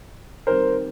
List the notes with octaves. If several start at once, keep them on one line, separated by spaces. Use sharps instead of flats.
D#3 G3 C4 A#4 C5